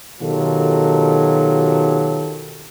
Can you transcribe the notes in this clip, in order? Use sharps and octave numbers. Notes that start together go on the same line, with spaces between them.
B2 D#3 F#3 F4 G4 A4